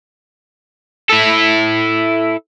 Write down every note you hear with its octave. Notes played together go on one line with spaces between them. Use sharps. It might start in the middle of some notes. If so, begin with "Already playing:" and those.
E4 A4